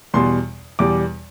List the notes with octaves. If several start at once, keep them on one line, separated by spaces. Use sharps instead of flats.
E2 B2 G3 C6
E2 B2 G3 D6